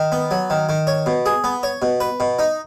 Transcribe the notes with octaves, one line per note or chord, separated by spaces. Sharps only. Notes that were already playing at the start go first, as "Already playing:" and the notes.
Already playing: D#3
B3
F#3
D#3
D#3
C#5
B2
G#4
B3
C#5
B2
B4
B2
D#4